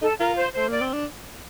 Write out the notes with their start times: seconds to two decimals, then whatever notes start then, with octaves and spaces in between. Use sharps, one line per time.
0.02 D#4 A4
0.19 F4 A#4
0.37 C5
0.54 A3 C5
0.68 A#3 D5
0.81 C4
0.93 D4